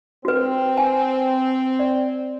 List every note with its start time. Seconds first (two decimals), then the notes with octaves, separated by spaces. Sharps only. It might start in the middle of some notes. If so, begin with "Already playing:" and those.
0.25 C4 F#4 B4
0.77 G#5
1.79 D5